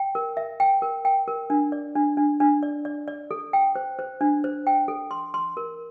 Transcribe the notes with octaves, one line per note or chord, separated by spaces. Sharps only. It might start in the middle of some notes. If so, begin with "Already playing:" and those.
Already playing: G5
A#4
E5
G5
A#4
G5
A#4
D4
D5
D4
D4
D4
D5
D5
D5
A4
G5
C5
C5
D4
C5
G5
A4
C6
C6
A#4